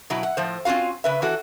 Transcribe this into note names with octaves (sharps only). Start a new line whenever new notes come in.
B2 F#3 E4
F#5
A2 F3 C5
C4 C#4 F4 F#4 F5
C#3 B4 E5
E3 F#4 A4